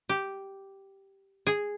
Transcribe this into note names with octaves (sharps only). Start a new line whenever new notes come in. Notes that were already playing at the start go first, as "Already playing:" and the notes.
G4
G#4